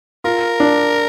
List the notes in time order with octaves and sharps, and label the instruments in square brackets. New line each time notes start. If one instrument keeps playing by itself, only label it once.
[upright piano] F4 [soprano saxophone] A#4
[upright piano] D4